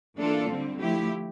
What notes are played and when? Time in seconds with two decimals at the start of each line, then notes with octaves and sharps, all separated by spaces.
0.18 E3 A#3 D4 F4 A4
0.50 D3 G3 C4
0.80 F3 A3 E4 G4